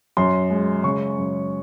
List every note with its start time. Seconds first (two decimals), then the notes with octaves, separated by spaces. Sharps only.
0.17 F#2 C6
0.50 G#3
0.84 C#3 C#6
1.17 F#2